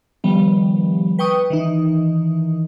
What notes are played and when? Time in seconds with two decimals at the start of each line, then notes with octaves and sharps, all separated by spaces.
0.24 D#3 F3 G3 B3
1.19 B4 G5 C#6 D#6
1.50 D#3 E3 D#4